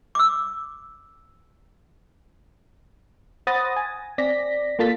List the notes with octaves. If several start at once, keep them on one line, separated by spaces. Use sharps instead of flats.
D6 E6
C5 F#5 B5 D#6 A6 A#6
G#5
C4 D5 A#6 B6
A#3 F4 A4 A6 B6